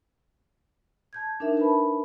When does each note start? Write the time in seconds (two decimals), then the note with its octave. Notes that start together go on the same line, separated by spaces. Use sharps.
1.13 A5 G6 G#6
1.40 D4 D#4 A#4 E5
1.57 A#4 B4 A5 B5